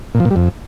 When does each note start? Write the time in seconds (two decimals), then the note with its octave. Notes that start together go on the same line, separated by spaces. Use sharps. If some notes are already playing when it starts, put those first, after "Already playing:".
0.15 A#2
0.20 F3
0.25 A#2
0.31 G3
0.36 F2